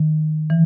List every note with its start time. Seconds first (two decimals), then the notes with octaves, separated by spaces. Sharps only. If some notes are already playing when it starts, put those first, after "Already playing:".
Already playing: D#3
0.50 E3